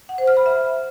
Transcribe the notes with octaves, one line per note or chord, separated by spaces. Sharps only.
F#5
C5
F6
B5
E5